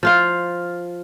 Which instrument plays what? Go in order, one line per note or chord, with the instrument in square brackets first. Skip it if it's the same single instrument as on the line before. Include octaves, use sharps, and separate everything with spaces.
[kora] F3 F4 F5